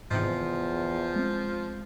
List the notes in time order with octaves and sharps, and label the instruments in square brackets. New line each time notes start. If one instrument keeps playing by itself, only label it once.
[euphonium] E2 [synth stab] G#2 C3 D#3 [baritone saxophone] F3
[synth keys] G#3 C4